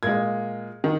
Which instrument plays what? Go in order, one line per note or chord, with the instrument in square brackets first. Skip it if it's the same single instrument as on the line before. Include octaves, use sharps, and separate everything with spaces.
[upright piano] A#2 G#3 G#6
D#3